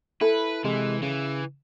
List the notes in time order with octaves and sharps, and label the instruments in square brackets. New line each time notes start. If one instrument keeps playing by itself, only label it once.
[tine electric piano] E4 [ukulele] A4 [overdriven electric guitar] B4
[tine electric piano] C3 G#3 [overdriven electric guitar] E3
[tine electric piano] C#3 [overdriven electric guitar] E3